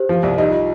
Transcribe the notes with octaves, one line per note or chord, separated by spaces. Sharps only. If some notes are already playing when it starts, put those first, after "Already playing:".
Already playing: G4 C5
F3
C2
D#4 G4
F4